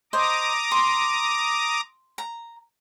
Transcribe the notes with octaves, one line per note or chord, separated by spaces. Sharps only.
C5 D#5 A#5 D6 D#6
C6
A#5